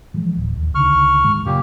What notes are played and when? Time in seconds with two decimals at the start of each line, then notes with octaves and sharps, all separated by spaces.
0.14 E3 F3 G#3
0.37 D1
0.57 D#2
0.75 C#2 D3 D#3 C#6 F6
1.24 G#2 D#3 G#3
1.46 F#2 A#2 C#3 A#3 G4